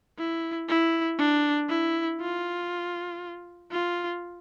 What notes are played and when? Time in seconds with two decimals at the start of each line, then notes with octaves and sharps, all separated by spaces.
0.19 E4
0.69 E4
1.19 D4
1.69 E4
2.21 F4
3.72 F4